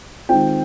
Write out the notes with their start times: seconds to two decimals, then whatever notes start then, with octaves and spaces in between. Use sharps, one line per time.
0.29 D#3 G#3 C4 F4 G5